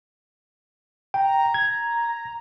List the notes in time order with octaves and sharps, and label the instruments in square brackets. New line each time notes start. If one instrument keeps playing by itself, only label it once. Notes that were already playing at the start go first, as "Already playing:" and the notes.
[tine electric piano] G5 [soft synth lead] A#5
[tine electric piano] G#6